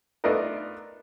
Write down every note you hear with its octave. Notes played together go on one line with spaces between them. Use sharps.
A3 B3 D4 D#4 F4 A#4